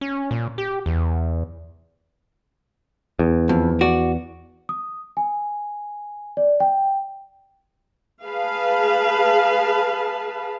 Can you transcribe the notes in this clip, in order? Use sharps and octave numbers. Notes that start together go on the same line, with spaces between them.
C#4
A#2
G4
E2
E2
F2
F#4 D5
D#6
G#5
D5
G5
G#4 B4 F5 A5